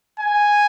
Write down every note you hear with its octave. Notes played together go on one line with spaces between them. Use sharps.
G#5